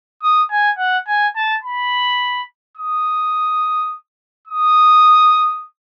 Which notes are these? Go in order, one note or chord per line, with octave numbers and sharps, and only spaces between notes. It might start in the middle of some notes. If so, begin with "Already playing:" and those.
D#6
G#5
F#5
G#5
A5
B5
D#6
D#6